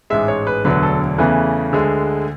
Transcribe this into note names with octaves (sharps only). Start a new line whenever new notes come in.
A1 G#2 G#3 E5
C#5
B4
E1 D2 D3 F#3 B4
A4
E2 C#3 E3 A3 B4
D2 D3 G#3